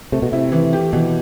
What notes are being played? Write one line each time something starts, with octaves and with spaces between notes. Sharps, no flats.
C3 A3
B2
C3 E4
E3
G4
B2 E3